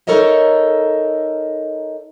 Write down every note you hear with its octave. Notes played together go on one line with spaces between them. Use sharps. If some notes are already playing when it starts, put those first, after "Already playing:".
D#4 A4 A#4 C#5 D#5 E5